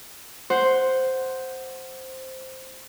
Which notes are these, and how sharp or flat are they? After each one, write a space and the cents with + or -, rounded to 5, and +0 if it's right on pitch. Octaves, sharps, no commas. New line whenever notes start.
C5 +0 F#5 +0